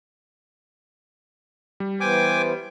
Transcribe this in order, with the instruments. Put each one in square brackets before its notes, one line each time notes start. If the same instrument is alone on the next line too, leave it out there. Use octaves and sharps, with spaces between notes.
[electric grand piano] G3
[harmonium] E3 B3 C5 [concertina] G5 G#5 D6